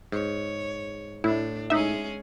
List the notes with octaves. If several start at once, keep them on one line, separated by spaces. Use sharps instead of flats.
G#2 C#5
A2 A3 D4 E4
G#3 C#4 D#4 G#4 E5